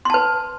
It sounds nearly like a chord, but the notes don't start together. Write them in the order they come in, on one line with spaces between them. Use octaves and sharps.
C6 A5 B4